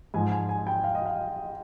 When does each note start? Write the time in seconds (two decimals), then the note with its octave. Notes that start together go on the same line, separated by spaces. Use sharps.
0.14 G#2 F3 G#5
0.32 G#5
0.49 G#5
0.67 G5
0.84 F5
0.95 D#5
1.06 F5